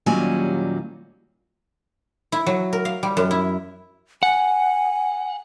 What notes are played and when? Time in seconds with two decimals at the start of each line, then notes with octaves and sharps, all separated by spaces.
0.06 D#2 A#2 F#3 G3 C#4 G#5
2.32 E4
2.46 F#3
2.73 A#4
2.85 F5
3.03 G3
3.17 F#2
3.31 E4
4.23 F#5 G#5